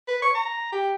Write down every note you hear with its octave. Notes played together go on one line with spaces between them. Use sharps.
B4
C#6
A#5
G4